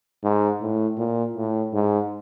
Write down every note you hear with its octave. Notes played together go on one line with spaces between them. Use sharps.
G#2
A2
A#2
A2
G#2